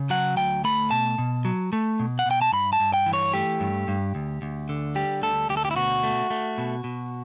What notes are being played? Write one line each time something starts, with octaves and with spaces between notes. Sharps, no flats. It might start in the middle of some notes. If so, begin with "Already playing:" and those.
Already playing: C#3
F#3 F#5
D2 G5
A3 B5
B2 A5
B2
F#3
A3
B2
F#5
B2 G5
A5
G2 B5
A5
G2
G5
E3
C#5
A3 G4
G2
G2
D2
D2
D3
G3 G4
D2 A4
D2 G4
A4
G4
E4
B2 F#4
A3
A3
B2
B2